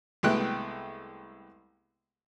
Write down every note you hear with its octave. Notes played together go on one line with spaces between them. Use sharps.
C2 G#3 A3 B3 G5 F#6